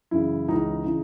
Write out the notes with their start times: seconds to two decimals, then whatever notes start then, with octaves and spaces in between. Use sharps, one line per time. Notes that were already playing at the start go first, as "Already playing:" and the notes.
0.11 F#2 C#3 E3 E4
0.48 C#2 C#3 E3 D#4
0.85 C#3 E3